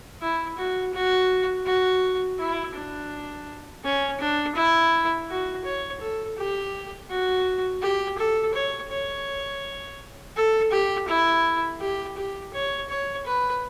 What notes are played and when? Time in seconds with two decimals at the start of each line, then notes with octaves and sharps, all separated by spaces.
0.21 E4
0.57 F#4
0.93 F#4
1.66 F#4
2.38 E4
2.74 D4
3.84 C#4
4.20 D4
4.56 E4
5.29 F#4
5.65 C#5
6.01 A4
6.37 G4
7.10 F#4
7.82 G4
8.18 A4
8.54 C#5
8.91 C#5
10.36 A4
10.72 G4
11.08 E4
11.80 G4
12.17 G4
12.53 C#5
12.89 C#5
13.26 B4